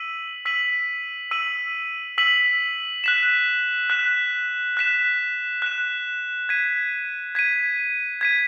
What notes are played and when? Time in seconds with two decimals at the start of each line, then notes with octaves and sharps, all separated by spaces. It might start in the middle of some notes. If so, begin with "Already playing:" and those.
Already playing: E6 B6 D#7 F#7
0.45 E6 B6 D#7 F#7
1.31 E6 B6 D#7 F#7
2.18 E6 B6 D#7 F#7
3.04 F#6 B6 E7
3.90 F#6 B6 E7
4.77 F#6 B6 E7
5.62 F#6 B6 E7
6.49 G#6 B6 D#7
7.35 G#6 B6 D#7
8.21 G#6 B6 D#7